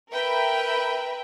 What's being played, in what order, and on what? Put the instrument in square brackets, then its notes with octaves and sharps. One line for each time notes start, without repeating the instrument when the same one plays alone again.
[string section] A#4 B4 E5 G5 B5